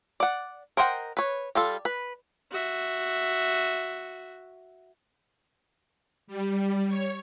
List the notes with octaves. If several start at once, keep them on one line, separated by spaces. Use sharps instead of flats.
D5 F#5
A#4 C5 D#5 F#5 G5
B4 C#5
G3 F4 A4
B4
F#4 E5
G3
C#5